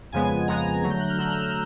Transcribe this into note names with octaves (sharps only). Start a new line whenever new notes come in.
F2 C#3 F3 G#3 B3 G#5
F2 C#3 F3 G#3 B3 A#5
D3 F#3 A3
G6
F#6
F6
D3 F#3 A3 E6